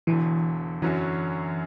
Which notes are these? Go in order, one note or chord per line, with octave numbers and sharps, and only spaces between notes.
E1 E2 D3 E3
F#2 D3 E3 F#3 C#4 F#4